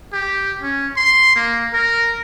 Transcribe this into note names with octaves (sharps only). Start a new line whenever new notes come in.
G4
C#4
C6
A#3
A#4